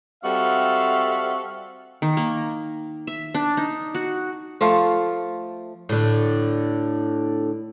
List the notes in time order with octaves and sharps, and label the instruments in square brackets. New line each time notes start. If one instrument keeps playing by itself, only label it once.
[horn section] G3 C4 F#4 A4 E5 F5
[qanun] D#3
A#3
E5
D4
D#4
F#4
[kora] F3 A3 F4
[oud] A2 D3